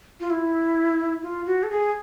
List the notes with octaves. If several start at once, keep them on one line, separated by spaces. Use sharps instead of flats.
F4
E4
F4
F#4
A4
G#4